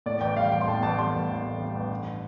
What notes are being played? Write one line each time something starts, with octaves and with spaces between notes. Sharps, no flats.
A2 D5
A1 G5
G3 F5
A1 G5
C6
A2 A5
A1 A5
G3 C6
A1
A2
A1
G3
A1
G2